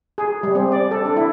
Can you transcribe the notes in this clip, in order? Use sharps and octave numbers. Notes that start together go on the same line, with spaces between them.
G#4
G3
C4
D5
A4
D4
E4